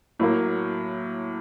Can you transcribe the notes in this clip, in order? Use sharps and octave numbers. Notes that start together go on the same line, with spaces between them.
A2 F#3 A#3